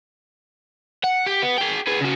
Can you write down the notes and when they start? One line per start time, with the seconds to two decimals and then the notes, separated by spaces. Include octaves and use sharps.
1.04 F#5
1.26 G4
1.42 B3
1.58 G#4 G5
1.87 G#4 B4
2.01 C#3 F#4